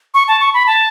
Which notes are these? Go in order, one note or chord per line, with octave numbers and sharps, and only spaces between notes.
C#6
A5
C#6
B5
A5